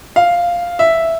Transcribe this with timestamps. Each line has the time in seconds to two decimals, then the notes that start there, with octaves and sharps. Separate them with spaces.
0.16 F5
0.79 E5